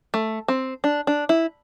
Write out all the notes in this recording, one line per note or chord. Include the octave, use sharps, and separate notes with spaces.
A3
C4
D4
D4
E4